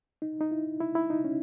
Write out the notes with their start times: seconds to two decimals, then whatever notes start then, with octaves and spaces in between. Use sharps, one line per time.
0.22 D#4
0.41 D#4
0.51 E4
0.80 E4
0.95 E4
1.10 D#4
1.24 C#4